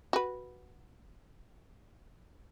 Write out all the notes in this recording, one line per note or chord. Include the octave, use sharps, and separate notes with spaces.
F#4 B4